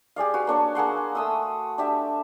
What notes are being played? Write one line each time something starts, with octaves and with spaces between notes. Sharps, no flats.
G4 G#4 D5 F5
F#4 B4
A#3 D4 C#5
A#3 G#4 F#5 C6
A3 D#6 E6
D4 G4 E5